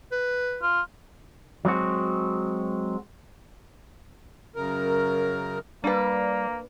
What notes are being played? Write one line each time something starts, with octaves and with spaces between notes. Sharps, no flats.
B4
F4
F#3 G#3 C4 F#4
F#2 C#3 A#4
G3 A#3 D4 B4